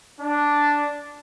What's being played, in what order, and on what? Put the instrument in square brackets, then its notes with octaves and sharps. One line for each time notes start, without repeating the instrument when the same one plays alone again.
[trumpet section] D4